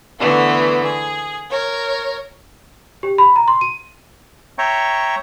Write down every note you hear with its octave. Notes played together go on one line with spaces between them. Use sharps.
D3 E3 A3 B3
G#4
A#4 C#5
G4
B5
A#5
C6
D#7
C#5 E5 G5 A#5 C#6